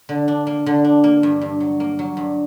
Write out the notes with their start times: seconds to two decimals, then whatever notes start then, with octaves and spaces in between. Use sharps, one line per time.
0.09 D3
0.28 D4
0.47 A#3
0.66 D3
0.84 D4
1.04 A#3
1.23 G2
1.41 G2
1.60 F#3
1.80 A#3
1.99 F#3
2.17 G2